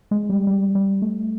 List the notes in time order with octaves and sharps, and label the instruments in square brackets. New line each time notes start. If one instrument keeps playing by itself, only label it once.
[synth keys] G#3
G3
G3
G3
A3